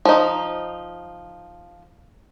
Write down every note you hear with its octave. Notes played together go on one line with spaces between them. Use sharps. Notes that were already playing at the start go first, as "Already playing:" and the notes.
F3 D#4